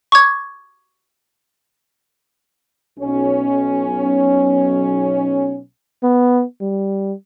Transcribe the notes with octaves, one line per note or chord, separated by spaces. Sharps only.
C#6 D6 G#6
B1 C#4
B3
G3